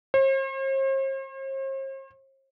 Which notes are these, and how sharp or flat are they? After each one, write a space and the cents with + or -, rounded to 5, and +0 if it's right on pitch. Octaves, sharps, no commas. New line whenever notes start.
C5 +45